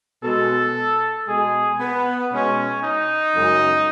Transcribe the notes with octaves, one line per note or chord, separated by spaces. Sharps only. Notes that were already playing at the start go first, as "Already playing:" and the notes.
B2 G#3 A4
B2 G#3 G#4
B3
B2 G#3 C#4
D#4
F#2 C#3 G#3